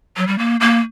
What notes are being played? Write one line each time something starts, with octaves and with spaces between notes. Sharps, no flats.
F#3
G3
A#3
A#3